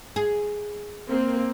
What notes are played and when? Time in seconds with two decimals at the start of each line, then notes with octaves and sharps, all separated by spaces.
0.16 G#4
1.09 A#3 C4